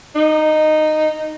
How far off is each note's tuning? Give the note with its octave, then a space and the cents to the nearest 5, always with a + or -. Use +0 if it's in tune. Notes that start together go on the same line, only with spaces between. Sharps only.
D#4 -10